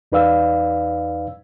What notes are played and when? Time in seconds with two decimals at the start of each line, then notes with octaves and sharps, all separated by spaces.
0.12 E2 D#4 B4 D5 F5 E6